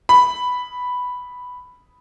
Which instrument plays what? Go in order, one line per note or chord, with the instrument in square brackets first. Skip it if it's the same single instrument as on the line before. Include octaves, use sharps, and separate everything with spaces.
[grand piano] B5